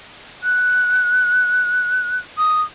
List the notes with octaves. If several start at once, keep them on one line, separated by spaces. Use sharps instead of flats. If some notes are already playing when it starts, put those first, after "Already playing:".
F#6
D#6